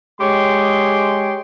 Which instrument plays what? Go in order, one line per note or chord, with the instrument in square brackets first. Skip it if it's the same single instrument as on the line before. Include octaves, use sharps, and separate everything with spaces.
[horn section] G#3 G4 C#5 C6